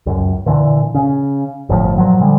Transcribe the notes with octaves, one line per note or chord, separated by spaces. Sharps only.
C#2 F#2
A#2 D3 E3
C#3
G1 A2 D3 F3
A#2 F3 F#3
D3 F3 G3 G#3